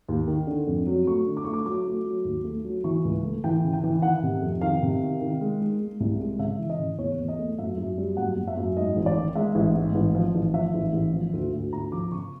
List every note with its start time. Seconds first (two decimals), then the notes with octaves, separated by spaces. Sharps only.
0.08 D#2
0.28 D#3
0.47 D3
0.67 F2
0.87 F#3
1.07 A3 C#6
1.26 D3
1.37 D6
1.45 A3 C#6
1.53 D6
1.65 F#3 D6
1.85 A3
2.05 F#3
2.25 D#2
2.44 A3
2.65 F#3
2.84 E3 C#6
3.05 C#2
3.24 A3
3.44 E3 G5
3.64 C#3
3.73 G5
3.84 E3
4.02 D#3 F#5
4.23 C3
4.42 F2
4.61 D#3 F5
4.82 C3
5.01 D#3
5.21 D#3
5.41 G#3
5.61 G#3
5.80 G#3
6.00 C2
6.20 G#3
6.39 C#3 E5
6.59 E3
6.70 D#5
6.79 C#3
6.99 E2 C#5
7.18 E2
7.28 D#5
7.39 A3
7.58 F#2 E5
7.77 F#2
7.98 G3
8.17 F#2 F#5
8.36 F#2
8.48 E5
8.57 F#2
8.77 G#2 D#5
8.97 A1
9.06 D5
9.16 D#3
9.35 G#3 E5
9.55 A1
9.75 G#2
9.95 A1
10.15 F3
10.35 A1
10.54 F3 E5
10.74 A1
10.93 A1
11.14 F3
11.33 D2
11.53 D2
11.73 D2 A#5
11.92 F3 D6
12.12 C#3 C#6